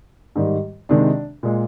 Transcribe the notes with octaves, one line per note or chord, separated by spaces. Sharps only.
G#2 D#3 G3
C3 D#3 G#3 D4
A#2 G#3